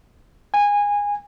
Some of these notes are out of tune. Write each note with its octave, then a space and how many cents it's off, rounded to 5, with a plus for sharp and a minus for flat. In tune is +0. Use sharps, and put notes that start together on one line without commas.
G#5 -20